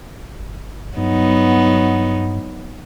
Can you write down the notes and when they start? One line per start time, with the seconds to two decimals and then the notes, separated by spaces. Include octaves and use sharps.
0.39 G1
0.97 G2 F#3 B3 D#4